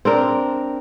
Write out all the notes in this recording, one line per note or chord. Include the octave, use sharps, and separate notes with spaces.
C4 D4 A#4